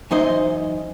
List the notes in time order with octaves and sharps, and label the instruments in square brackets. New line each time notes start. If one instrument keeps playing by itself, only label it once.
[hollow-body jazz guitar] F#2 E3 D#4 C5 D#5